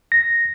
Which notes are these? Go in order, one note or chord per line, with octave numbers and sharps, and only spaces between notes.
A#6